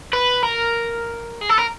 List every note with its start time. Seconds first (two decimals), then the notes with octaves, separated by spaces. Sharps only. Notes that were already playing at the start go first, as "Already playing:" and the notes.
0.13 B4
0.43 A#4
1.41 G#4
1.49 A4
1.58 A#4